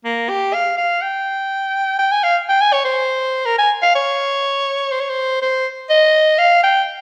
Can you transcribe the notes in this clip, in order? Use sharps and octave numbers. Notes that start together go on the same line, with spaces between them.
A#3
G4
F5
F5
G5
G5
G#5
F5
G5
G#5
C#5
C5
A#4
G#5
F5
C#5
C5
C#5
C5
C5
D#5
F5
G5